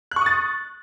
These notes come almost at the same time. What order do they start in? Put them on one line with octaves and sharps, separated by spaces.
F#6 C#6 D#6 A6